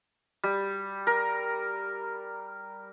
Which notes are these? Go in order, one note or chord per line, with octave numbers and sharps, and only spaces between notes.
G3
A#4